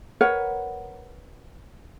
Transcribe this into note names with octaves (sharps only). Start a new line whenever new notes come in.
A#4 B4 C#5 F#5